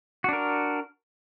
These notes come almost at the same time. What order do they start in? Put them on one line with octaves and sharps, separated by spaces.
F#4 D4 A#4